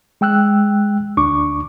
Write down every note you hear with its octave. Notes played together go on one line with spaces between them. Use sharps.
G#3 G5 E6 F#6
D2 D4 C#6 D6